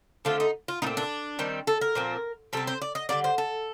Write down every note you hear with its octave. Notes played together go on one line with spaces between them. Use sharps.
D3 A3 C4 F4
D#4
F4
A#2 A3 C4 D#4
D4
D#3 G3 C4
A4
A#4
A#2 F3 C4
C3 G3 C4 A4
C5
D5
D#5
D3 G3 A#3 D5
C5
A4